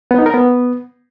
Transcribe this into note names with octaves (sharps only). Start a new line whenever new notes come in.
B3
D#4
A#4
B3